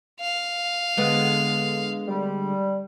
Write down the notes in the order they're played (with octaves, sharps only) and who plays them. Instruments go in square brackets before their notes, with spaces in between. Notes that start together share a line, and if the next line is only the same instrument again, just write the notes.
[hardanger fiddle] F5
[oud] D3 G#3 B3
[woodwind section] G3